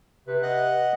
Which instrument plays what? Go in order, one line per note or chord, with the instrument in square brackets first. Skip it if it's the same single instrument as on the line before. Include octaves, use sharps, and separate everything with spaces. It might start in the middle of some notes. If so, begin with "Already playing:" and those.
[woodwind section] C3 B4
[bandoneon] D#5 F#5 F#6